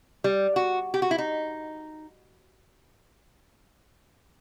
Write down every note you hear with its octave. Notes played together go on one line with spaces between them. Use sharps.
G3
F#4
G4
F#4
E4
D#4